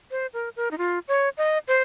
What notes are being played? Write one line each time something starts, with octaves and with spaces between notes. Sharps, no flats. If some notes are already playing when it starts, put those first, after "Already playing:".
C5
A#4
A#4
D#4
F4
C#5
D#5
C5